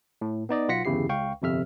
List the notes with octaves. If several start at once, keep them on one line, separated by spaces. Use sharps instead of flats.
A2
B3 D#4 D5 D#5
B1 F4 F#5 A#6 B6 C#7
G1 E2 C#3 E4 G4 C7
C#2 F5 G5 C#6
G1 F2 C3 E5 F6